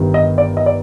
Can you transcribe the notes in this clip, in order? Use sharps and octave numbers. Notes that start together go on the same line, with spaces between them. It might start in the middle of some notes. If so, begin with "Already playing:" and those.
Already playing: G1 G2 D#3
D#5
D5
D#5
D5